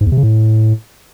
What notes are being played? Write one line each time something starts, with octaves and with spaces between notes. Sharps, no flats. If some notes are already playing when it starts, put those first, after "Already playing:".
G#2
E2
C3
C#3
A2